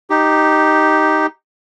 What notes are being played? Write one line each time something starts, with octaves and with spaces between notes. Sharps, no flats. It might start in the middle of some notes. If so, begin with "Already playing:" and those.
D#4 G4